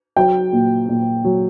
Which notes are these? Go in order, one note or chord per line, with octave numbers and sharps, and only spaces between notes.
F#3 G5
A#2
A#2
F#3